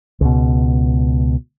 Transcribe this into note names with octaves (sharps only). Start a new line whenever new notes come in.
C#2 B2